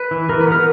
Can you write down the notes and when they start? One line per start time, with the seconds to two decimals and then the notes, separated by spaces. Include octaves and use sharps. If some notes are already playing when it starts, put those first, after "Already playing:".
Already playing: B4
0.11 E3
0.29 E3 A#4
0.41 B4
0.47 B3 A#4